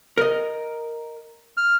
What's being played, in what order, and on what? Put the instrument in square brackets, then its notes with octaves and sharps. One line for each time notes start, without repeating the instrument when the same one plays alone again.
[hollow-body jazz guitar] A#4 D#5
[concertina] F6